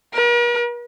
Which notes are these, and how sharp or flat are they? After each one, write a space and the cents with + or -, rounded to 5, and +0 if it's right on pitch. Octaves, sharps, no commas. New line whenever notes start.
A#4 +45